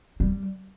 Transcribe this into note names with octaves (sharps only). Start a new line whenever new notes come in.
G3